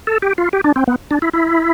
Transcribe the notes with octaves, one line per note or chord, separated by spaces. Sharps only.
A4
G4
F4
G4
D4
C4
B3
D4
E4
E4